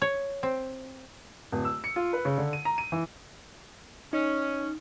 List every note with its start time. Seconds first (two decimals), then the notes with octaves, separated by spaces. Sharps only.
0.02 C#5
0.43 C4
1.52 D1
1.65 E6
1.84 C#7
1.96 F4
2.13 B4
2.25 C#3
2.38 D3
2.53 D#7
2.65 A#5
2.78 D#7
2.92 E3
4.13 C#4 D#4